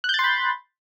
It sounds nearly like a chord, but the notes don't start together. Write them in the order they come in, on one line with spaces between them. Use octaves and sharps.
F#6 G6 A6 C6 B5